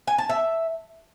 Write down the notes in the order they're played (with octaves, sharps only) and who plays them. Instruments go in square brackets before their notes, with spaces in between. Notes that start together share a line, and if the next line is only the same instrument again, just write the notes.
[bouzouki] G#5
A5
E5